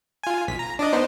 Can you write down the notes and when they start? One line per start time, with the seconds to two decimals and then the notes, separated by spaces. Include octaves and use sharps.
0.24 F4 G#5
0.48 B1 B6
0.59 A#5
0.79 D4 D5 D#5
0.93 B3 D#4 C5